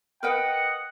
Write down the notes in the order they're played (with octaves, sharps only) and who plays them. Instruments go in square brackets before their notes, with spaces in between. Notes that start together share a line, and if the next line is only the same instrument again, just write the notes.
[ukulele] A#4 B4 G5 [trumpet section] D#5 F#5